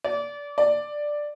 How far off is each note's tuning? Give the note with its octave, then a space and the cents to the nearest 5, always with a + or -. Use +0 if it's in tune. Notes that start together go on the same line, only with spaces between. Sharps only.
D5 -25
D5 +5